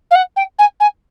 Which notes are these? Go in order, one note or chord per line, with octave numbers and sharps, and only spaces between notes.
F5
F#5
G5
G#5
G#5